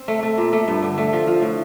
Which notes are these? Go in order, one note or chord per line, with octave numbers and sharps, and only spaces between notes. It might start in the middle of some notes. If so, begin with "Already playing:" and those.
Already playing: C4
A3
A3
A#2
A3
G2
D3
A3
F3
F3
A2